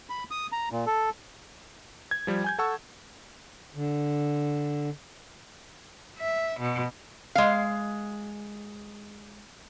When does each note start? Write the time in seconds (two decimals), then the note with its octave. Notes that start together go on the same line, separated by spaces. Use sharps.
0.10 B5
0.31 D#6
0.52 A#5
0.71 A#2
0.87 A4
2.11 G#6
2.27 F3 G3 G4
2.44 G#5 G6 G#6
2.58 A4 F#5 A5 C#6 E6
3.75 D3
6.19 E5
6.60 B2
7.35 G#3 F5